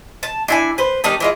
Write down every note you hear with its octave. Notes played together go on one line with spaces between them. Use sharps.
A5
D4 E4 G#5
B4 C5
D#3 G3 D4 D#4
E3 G#3 F4